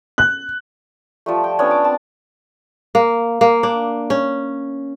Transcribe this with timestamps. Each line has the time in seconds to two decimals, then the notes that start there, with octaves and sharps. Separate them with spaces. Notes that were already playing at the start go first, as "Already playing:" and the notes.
0.18 F#6
1.26 F3 G3 A3
1.44 G5
1.59 B3 C#4 D4 C#5
1.71 D6
1.84 C4 A5
2.95 A#3
3.41 A#3
3.63 D4
4.10 C#4